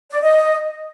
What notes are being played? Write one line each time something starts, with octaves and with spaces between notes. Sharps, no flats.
D5
D#5